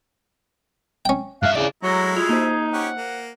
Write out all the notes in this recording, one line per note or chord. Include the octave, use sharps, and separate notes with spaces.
C#4 G5
G2 E5 F5 F#6
C#3 E4 D5
F#3 G#3 A3 E4 A#5
F4 F#4 G#4 F7
A#3 D#4 C5
C#4 G4 F#5
A#3